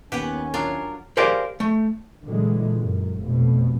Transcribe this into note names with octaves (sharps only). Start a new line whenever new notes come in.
D#2 B3 C#4 G4 B4 F#5 G#5
F#3 D4 F4 A#4
G4 G#4 A#4 C5 D5 F5
A3
A#2 D3 E3 F#3 G#3
F#2
F1 B2